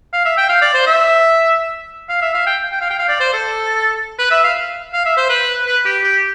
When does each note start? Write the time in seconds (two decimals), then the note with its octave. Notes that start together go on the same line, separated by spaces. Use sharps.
0.13 F5
0.25 E5
0.37 G5
0.49 F5
0.62 D5
0.74 C5
0.87 E5
2.09 F5
2.21 E5
2.34 F5
2.46 G5
2.72 G5
2.81 F5
2.90 G5
2.99 F5
3.08 D5
3.20 C5
3.33 A4
4.19 B4
4.31 E5
4.44 F5
4.93 F5
5.05 E5
5.17 C5
5.29 B4
5.67 B4
5.85 G4
6.03 G4